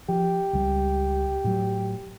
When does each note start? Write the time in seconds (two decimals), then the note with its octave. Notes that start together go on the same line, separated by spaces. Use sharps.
0.09 F3 G4
0.53 C#2 G3
1.44 A2 F#3